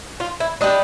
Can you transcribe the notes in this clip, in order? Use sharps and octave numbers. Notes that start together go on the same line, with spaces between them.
F4
E4
D4 G4 B4 D#5